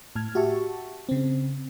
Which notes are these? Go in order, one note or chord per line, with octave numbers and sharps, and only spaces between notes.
A2 A5 F6 G#6
F#4 G4 E5 A5 C#6
C#3 C4